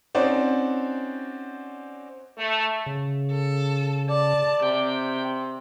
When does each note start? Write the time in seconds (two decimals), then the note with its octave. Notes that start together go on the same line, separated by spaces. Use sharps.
0.15 C4 C#4 D#4 F#4 C5 D5
2.38 A3
2.86 C#3
3.31 A4
4.10 D5 A5
4.63 C3 G5